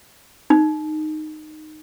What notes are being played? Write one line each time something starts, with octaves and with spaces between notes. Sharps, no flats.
D#4